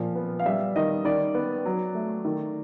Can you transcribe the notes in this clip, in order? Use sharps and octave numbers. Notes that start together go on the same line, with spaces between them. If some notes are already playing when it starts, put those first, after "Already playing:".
Already playing: A#2 F3
B3
F5
G3 E5
D#3 D#5
D#3 D5
B3
F#3
A3
D#3